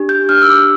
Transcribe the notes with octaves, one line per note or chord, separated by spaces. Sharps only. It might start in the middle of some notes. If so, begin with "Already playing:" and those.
Already playing: D4 G4
G6
D4 F6
E6
D6